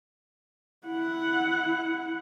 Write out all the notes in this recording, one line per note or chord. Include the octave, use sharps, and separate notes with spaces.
E4 F#5